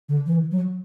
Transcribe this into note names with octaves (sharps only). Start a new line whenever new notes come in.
D3
E3
F#3